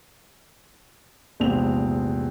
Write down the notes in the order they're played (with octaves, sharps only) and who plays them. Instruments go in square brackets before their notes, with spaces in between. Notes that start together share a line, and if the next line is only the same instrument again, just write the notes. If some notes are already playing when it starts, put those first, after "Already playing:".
[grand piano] A#1 E2 G#2 C3 C4 F7